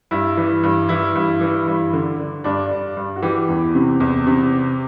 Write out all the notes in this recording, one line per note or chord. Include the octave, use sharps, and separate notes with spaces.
G2 E4
E3
G2
E3 E4
G2
E3
G2
D3
D3
G2 D4
G2
G2
F#4
E3 G4
E2
C3
E2
C3